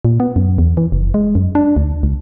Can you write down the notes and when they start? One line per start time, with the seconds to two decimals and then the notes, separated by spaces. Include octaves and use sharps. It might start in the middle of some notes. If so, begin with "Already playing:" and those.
0.05 A#2
0.20 B3
0.36 F#2
0.58 E2
0.77 E3
0.92 F#1
1.14 G#3
1.35 F#2
1.55 D4
1.76 D2
2.03 C#2